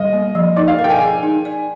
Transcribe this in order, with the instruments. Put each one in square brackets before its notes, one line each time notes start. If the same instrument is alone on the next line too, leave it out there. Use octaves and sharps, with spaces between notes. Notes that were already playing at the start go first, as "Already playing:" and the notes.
Already playing: [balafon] G3 [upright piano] D#5
[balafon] A#3
F3
[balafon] D#4 [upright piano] D5
[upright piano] F5
[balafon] A#4
[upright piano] G5
G#5
[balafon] G#4
D#4
D5